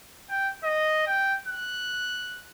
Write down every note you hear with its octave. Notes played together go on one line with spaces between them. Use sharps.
G5
D#5
G5
F#6